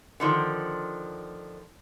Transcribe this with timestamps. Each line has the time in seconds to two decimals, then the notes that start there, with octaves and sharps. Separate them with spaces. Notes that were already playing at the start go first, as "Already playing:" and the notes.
0.20 D3 D#3 F3